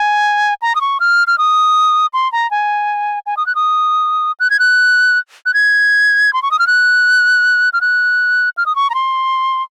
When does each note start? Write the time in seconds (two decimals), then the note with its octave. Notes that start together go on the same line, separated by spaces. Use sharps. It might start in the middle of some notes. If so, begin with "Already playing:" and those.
Already playing: G#5
0.62 A#5
0.75 D#6
0.81 C#6
1.00 F6
1.27 F6
1.38 D#6
2.14 C6
2.32 A#5
2.51 G#5
3.26 G#5
3.37 D#6
3.46 F#6
3.55 D#6
4.40 F#6
4.50 G#6
4.59 F#6
5.46 F#6
5.54 G#6
6.33 C6
6.43 C#6
6.51 D#6
6.59 F6
6.67 F#6
7.73 F6
7.81 F#6
8.58 F6
8.66 D#6
8.76 C#6
8.90 A#5
8.95 C6